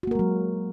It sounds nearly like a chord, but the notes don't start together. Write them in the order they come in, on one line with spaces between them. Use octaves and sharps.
F#4 A#3 A#4 G#3 F#3